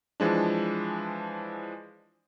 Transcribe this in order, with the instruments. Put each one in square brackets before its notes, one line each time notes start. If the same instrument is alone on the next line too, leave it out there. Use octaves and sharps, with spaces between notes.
[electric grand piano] E3 F3 G#3 D4